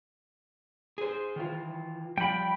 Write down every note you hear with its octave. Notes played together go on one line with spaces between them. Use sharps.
G#4 C5
D#3 E3 F4
F3 G3 G5 B5